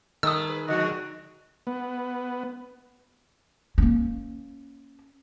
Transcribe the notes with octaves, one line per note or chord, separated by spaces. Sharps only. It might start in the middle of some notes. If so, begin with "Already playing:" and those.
D#3 G3 A3 A4 D#6 E6
G#4 B4
D3 F3 G#3 D#4 F#4
B3
A#3 C#4